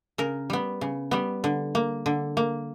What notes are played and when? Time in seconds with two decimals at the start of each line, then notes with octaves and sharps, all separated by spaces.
0.18 C#3 A#4
0.50 G3 B3
0.81 C#3
1.11 G3 B3
1.44 D3
1.75 A#3
2.06 D3
2.37 A#3